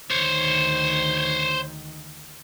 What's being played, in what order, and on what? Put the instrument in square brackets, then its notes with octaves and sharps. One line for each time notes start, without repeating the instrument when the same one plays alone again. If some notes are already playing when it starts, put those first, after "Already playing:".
[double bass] D2 D#3 [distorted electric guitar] C5 C#5